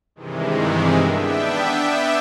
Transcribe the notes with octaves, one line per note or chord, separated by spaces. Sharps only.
G2 C3 D#3 E3 G#3
B3 D4 E5 G5